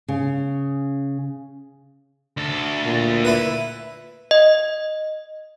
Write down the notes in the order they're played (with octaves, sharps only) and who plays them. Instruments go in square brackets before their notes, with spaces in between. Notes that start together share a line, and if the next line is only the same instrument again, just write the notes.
[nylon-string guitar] C#3
[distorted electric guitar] D2 A4
[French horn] A#2
[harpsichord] E4 B4
[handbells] D#5